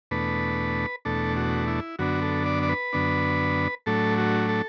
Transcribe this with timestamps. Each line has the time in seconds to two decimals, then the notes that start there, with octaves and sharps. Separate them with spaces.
0.11 E2 B2 A3 D4 B4
1.05 E2 B2 A3 D4 A4
1.37 F#4
1.68 E4
1.99 F#2 D3 B3 D4 F#4
2.22 A4
2.46 D5
2.63 D5
2.69 B4
2.93 F#2 D3 B3 D4
3.86 A2 F#3 A3 D4 A4
4.18 F#4
4.49 A4